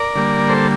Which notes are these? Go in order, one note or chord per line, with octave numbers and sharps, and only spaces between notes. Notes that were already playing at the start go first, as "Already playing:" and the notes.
Already playing: A#4 D5
D3 G3 A#3
A4 C5